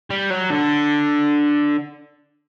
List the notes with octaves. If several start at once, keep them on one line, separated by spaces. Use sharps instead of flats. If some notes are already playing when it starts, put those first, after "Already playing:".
G3
F#3
D3